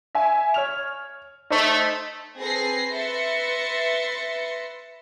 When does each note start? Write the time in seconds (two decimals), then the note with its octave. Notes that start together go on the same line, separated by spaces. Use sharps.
0.15 E5 G#5
0.54 C#5 F6 F7
1.50 A3 D#4 C5
2.38 C4 G#4 A4 B4 A#6 C7
2.92 B4 E5 C6 A6 A#6 C#7